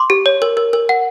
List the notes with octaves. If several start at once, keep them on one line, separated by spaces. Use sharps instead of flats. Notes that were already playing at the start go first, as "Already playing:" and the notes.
Already playing: C6 D6
G4
C#5
A#4
A#4
A#4
F#5